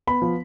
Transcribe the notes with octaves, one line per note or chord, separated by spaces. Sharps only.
B3 B5
F3